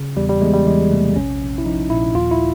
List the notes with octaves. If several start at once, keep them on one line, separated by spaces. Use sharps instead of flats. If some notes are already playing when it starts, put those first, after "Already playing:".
Already playing: C#3
E2 G3
G3
E2 G#3
G3
E3 G#3
C3 A3
A#1 C#4
A#1
E4
F3 D#4
A#2 E4
D#2 F4
E4